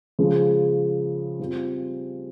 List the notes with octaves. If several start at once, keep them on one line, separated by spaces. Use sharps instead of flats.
C#3 F3 G#3
G3 C4 F4